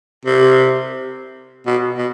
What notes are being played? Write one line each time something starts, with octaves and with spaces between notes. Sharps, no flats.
C3
B2
B2